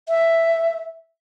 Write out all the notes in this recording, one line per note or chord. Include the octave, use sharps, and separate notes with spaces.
E5